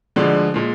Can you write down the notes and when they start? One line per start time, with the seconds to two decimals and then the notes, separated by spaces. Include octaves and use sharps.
0.16 D2 D3 F3 G#3 D5
0.54 A#2 G#3